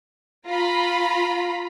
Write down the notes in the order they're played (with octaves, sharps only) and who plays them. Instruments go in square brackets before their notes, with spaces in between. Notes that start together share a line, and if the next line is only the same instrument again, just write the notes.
[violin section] F4 A#5 B5